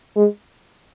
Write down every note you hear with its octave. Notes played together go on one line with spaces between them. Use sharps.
G#3